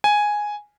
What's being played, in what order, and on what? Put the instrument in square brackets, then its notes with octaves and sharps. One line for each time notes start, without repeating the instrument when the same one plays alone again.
[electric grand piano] G#5